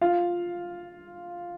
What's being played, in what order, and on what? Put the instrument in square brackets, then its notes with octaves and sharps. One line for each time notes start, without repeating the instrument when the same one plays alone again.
[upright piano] F4 F5